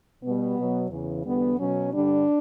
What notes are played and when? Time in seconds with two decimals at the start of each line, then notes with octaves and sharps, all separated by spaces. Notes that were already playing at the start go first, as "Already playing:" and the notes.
0.23 B2 G3 B3
0.58 B2 F#3
0.90 E2 C#3 E3
1.24 E2 D3 G3 B3
1.58 B2 F#3 C#4
1.91 G2 D3 G3 D4